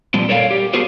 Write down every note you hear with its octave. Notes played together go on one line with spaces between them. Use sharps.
A#2 F3 G3 C4
A4 A#4 C#5 D5 E5 F5
G4
B3 F#4 G#4 A#4 C5